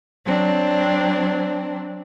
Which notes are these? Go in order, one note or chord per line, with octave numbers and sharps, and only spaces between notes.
F#3 C4 D4